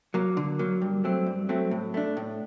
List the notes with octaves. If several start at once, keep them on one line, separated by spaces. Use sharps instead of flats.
F#3 A#3
D3
F#3 A#3
G2
F#3 A3 C4
G2
F#3 A3 C4
A2
A3 D4
A2